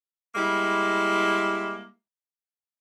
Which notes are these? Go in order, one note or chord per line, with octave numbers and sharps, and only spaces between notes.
G3 G#3 A#3 E4